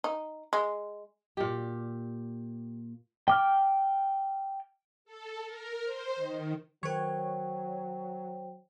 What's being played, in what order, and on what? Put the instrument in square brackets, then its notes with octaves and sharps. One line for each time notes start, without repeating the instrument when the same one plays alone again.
[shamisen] D#4
G#3
[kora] A#2 G4
[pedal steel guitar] G5 D6 F6
[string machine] A4
A#4
C5
D#3
[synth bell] D#3 A#4 [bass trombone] F#3 [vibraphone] C5 G5 [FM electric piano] C#5